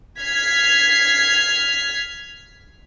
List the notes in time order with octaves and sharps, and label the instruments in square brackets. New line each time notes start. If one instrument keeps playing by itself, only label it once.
[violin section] F6 G#6 B6 C7